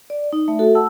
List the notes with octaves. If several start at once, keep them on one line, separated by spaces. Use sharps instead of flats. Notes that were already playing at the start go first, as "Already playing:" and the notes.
D5
D#4
A3 E5
F#4 A4 E5
F#5 A5 E6